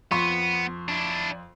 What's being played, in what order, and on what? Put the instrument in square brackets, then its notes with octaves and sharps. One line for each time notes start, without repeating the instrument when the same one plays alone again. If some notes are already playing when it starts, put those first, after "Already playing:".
[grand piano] F2 C6 C#6 [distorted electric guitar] B3
[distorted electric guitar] D4 E4